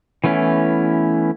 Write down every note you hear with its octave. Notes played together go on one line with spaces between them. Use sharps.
E3 A3 B3 C#4 E4